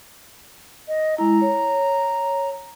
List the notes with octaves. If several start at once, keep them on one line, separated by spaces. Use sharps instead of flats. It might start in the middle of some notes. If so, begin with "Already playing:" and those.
D#5
G#3 E4 A#5
C#5